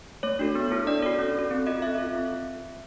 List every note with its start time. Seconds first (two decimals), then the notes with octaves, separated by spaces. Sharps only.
0.23 A3 C#5
0.39 D4 F#4 A4
0.55 B3
0.72 E4 A4
0.87 D4 D5
1.02 F#4 A4
1.19 C#4
1.35 F#4 A4
1.51 C4
1.67 F4 A4 D#5
1.82 C4 E5
1.98 F4 A4
2.15 C4